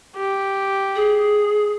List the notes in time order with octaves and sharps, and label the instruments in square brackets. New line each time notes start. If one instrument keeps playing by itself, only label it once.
[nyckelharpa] G4
[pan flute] G#4